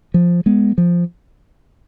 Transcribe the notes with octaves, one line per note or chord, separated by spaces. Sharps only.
F3
G#3 B3
F3